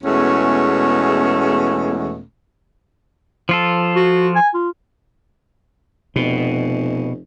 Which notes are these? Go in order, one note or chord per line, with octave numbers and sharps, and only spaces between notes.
E2 B2 G#3 A3 C#4
F3 F4 A4
F#4
G#5
F4
F1 B2